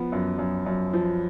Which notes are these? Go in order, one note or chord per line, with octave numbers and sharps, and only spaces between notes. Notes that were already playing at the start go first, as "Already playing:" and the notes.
Already playing: F3 B3
F#2
F#2
F#2
F3